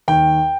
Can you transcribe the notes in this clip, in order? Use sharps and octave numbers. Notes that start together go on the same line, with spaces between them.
D#2 G5